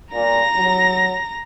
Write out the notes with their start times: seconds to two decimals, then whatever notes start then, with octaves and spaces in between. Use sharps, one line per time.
0.14 A#2 A#5 A#6
0.56 F#3